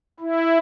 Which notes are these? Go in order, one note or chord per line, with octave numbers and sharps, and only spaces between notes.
E4